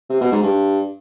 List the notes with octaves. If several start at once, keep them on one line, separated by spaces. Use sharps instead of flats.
C3
B2
G#2
G2